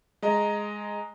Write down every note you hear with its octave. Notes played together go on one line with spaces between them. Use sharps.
G#3 D#5 A#5